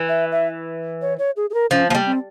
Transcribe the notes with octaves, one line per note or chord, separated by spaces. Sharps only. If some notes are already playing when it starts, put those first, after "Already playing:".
Already playing: E3
E5
E5
C#5
C#5
G#4
G#4
A#4
F3 C#4
F3 A#3
G3
C4